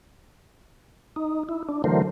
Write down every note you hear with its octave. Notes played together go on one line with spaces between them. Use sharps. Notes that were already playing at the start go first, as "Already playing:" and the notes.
D#4
E4
D4
D3 E3 F#3 A3 A#4 C5